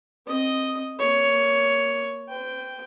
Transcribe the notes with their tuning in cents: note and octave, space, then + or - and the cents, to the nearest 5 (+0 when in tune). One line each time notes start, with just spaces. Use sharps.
C4 +20 D#5 +0
A#3 +0 C#5 +10
C5 -45 G5 +0